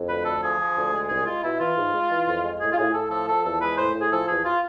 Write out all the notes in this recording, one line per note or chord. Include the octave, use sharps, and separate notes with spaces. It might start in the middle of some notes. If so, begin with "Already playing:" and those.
Already playing: F2
D2 B4
D2 A4
F3 G#4
F3
D2
G#3
C2 G#4
G#3 F4
B2 E4
E3 F4
G#2
G#3
E3
F2
G#3
A2 G#4
F4
A2 G#4
A2 A4
F3 A4
F3 A4
E2 A4
G#3 B4
A2 C5
A2
G#4
F3 A4
E2 G#4
F4